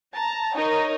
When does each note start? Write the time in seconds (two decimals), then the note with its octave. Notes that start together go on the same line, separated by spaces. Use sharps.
0.14 A5 A#5
0.55 D#4 A#4 C#5 D#5